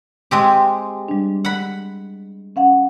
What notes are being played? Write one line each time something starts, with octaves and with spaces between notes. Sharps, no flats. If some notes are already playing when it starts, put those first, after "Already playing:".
G#3 C4 G4
G3 D4
F#5 B5
C#4 F5 F#5